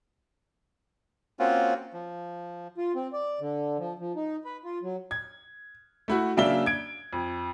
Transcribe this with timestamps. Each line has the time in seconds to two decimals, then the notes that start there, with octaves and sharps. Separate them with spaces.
1.39 A#3 C4 C#4 F4 F#4
1.93 F3
2.78 F4
2.95 C4
3.13 D5
3.41 D3
3.78 F3
3.99 F3
4.16 D#4
4.45 B4
4.64 F4
4.83 F#3
5.11 G#6
6.08 A3 E4 F#4
6.37 C#3 F#3 A#3 D4 E5 G7
6.66 G#6 D7
7.13 F2